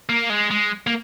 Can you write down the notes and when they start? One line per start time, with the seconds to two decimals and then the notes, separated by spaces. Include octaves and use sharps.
0.09 A#3
0.30 G#3
0.51 G#3
0.87 A#3